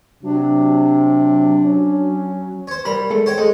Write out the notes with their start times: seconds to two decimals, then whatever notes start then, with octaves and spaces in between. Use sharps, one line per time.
0.23 C3 F#3 D4
1.65 C#4
2.67 C5 C#5
2.85 G3 A#4 B5
3.10 G#3 A4
3.26 C5 C#5 G5
3.38 G#3 A4